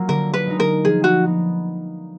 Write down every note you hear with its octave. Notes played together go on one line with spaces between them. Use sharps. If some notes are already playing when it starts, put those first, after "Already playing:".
Already playing: F#3 A#3 F4
D3 A#4
B4
G#3 D#4
A#4
F3 G#4
F#4
B3 D#4